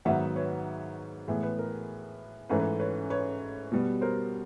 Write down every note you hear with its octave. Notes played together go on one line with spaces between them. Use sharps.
G#2 D#3 F#3 B3 E5 F#5
B4 C#5
A2 E3 G#3 B3
B4
A#4
G#2 E3 A3 C#4 B4
B4
B4 C#5
B4 C#5
B2 G3 B3
A#4 C5